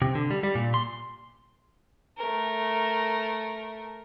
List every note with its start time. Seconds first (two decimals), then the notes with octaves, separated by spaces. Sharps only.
0.02 C3
0.15 D3
0.31 G3
0.43 G3
0.55 A#2
0.74 C6
2.18 A3 A#4